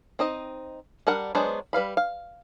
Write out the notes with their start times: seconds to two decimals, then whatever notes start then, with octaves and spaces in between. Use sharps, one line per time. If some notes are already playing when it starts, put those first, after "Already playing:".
0.19 C4 D#4 D#5
1.07 G3 D4 A#4 F#5
1.35 F#3 G#3 B3 D4 C5
1.73 G3 B4 F5 B5
1.97 F5